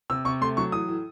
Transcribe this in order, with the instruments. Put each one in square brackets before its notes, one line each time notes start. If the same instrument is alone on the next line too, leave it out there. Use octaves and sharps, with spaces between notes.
[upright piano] C3 E6
C3 C#6
A3 C6
F#3 C#6
E3 D#6
A2